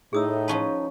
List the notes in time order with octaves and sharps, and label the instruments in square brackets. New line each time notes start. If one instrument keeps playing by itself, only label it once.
[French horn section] A2 [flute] D#4 [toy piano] G#4 D#6 E6
[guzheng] F3 C#4 B4 [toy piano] A5